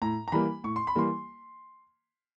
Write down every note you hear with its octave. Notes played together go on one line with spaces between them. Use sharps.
A2 A#5
A#5
E3 G3 A#3 B5
A2 C#6
C6
B5
E3 G3 A#3 C6